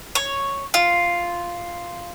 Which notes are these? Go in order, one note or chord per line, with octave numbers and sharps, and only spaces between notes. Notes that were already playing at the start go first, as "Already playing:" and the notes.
C#5
F4